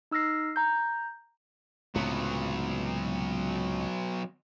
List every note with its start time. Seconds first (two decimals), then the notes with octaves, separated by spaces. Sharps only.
0.11 D#4 E6 F6 A#6 C7
0.56 A#5 G6
1.95 C#2 A2 C3 F#3 B3